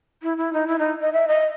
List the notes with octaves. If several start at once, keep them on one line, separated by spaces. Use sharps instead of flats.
E4
E4
D#4
E4
D#4
D#5
E5
D#5